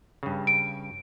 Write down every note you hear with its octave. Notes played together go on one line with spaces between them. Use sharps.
G2 C#3
D7